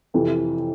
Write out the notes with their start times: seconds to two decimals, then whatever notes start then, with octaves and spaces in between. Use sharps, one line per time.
0.14 F2 C3 E3